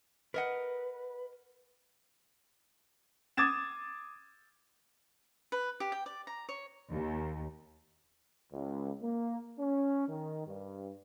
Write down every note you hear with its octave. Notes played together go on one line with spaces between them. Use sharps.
A#4 B4 D#5 F#5
D6 D#6 G#6 A6 E7
B4
G4
G5
D5
A#5
C#5
D#2
C#2
A#3
C#4
D#3
G2